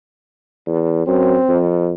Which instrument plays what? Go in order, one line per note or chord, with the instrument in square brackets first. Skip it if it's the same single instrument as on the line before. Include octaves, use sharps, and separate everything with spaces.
[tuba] E2
[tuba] F#2 [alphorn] C4
[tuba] F2